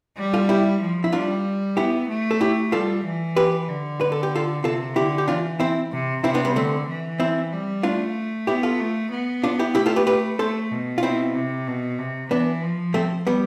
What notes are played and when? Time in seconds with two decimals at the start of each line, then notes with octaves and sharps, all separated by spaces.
0.17 G3
0.34 F4 A4
0.49 E4 G4
0.81 F3
1.04 E4
1.13 G3 D4 F4
1.77 B3 E4 G4
2.09 A3
2.31 A4
2.41 E4 G4
2.72 G3 F4 A4
3.05 E3
3.37 G4 B4
3.68 D3
4.01 B4
4.12 A4
4.23 G4
4.36 F4 A4
4.64 C3 F4 A4
4.96 D3 E4 G4
5.18 G4
5.28 E3 D4 F4
5.60 C4 E4
5.92 C3
6.24 C3 C4 E4
6.34 B3 D4
6.45 G3 B3
6.56 D3 A3 C4
6.88 E3
7.20 C4 E4
7.52 G3
7.83 A3 D4 F4
8.47 B3 E4 G4
8.63 F4 A4
8.79 A3
9.12 B3
9.44 D4 F4
9.59 E4 G4
9.75 A3 E4 G4
9.86 F4 A4
9.96 G4 B4
10.07 G4 B4
10.39 A3 A4 C5
10.71 B2
10.98 F4
11.03 C4 E4
11.35 C3
11.67 B2
11.99 C3
12.30 E3 B3 D4
12.62 F3
12.94 A3 C4
13.27 G3 B3